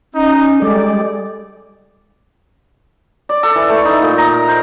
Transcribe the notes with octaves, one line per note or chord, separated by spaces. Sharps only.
C#4 D#4
G3 G#3 A4 D5
D5
A4
E3
A3
D#4
A#2
A#5
A#4
C5